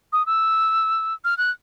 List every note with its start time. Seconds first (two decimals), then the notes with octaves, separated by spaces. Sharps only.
0.13 D#6
0.26 E6
1.25 F6
1.38 F#6